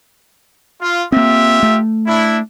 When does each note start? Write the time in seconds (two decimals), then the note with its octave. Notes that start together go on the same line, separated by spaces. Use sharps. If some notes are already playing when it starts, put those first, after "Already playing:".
0.81 F4
1.12 A#3 C4 F4 G4 E5
1.63 A3
2.07 D4 E4